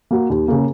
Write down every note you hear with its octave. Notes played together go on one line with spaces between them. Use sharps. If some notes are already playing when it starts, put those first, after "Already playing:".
A#3 F#4
D#2
C#3 A#3